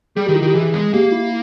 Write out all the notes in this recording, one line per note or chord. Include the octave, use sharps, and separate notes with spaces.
G3 G#4
D#3 G4
E4
D#3 G4
E3 G#4
G#3
A#3 G4
E4